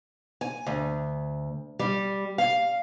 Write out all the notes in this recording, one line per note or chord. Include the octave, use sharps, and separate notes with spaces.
G#5
D2
G3
F5